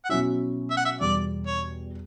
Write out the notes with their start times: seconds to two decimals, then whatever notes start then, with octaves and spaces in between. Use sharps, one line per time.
0.05 F#5
0.09 B2 F#3 C#4 E4 E5
0.70 E5
0.77 F#5
0.85 E5
1.01 E2 B2 G3 D5
1.47 C#5